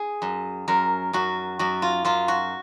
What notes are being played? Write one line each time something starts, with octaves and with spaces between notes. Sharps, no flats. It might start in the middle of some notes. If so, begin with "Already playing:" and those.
Already playing: G#4
F#2
F#2 A#4
F#2 F#4
F#2 F#4
F4
F#2 F4
F#4